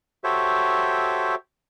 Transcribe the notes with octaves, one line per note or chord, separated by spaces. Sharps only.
F#4 G4 A4 C5 C#5 E5